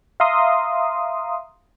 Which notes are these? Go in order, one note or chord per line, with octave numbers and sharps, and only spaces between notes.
E5 F5 A#5 C6 D#6